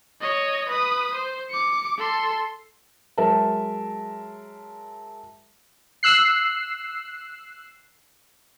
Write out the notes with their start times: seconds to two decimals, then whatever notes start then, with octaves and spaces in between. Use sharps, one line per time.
0.21 C#5 D#5
0.69 B4 D#6
1.14 C5
1.50 D6 C#7
1.98 A4 C6
3.18 F#3 G#3 A#4 E5 A5
6.03 E6 F#6 C7